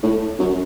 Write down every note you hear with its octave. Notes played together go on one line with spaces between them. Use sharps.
A2
F#2